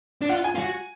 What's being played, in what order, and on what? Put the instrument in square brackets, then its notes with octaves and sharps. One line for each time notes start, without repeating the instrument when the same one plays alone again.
[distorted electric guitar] D4
[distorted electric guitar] F4 [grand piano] F#5
[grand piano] G#5
[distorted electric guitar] F4
F#4